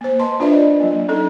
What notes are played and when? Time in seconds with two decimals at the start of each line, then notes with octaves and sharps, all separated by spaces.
0.01 A#3 C5
0.19 B4 C5 D#5 A5 C6
0.40 D4 F4 B4 D5 E5
0.52 D#5
0.80 F#3 A#3
1.09 C#4 D#4 A4